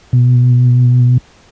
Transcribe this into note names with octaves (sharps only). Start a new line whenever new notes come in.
B2